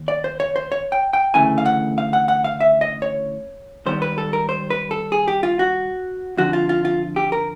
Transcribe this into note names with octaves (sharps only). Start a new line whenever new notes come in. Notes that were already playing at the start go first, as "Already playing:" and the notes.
Already playing: D#2
D5
C5
C#5
C5
C#5
G5
G5
D2 C#3 E3 A3 G#5
F5
F#5
F5
F#5
F#5
F5
E5
D#5
C#5
G#2 D#3 G3 B3 C5
B4
A4
A#4
C5
B4
A4
G#4
G4
F4
F#4
F2 D3 F3 F#4
F4
F4
F4
G4
A#4